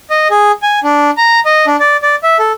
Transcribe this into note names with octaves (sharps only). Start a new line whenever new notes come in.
D#5
G#4
G#5
D4
A#5
D#5
D4
D5
D5
E5
A4